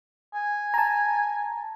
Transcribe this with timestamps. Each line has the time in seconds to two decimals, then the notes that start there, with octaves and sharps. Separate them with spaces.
0.35 G#5
0.74 A5 A#5